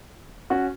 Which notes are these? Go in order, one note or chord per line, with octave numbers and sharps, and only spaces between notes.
C#4 F#4